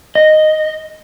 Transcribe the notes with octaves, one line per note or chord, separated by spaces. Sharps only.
D#5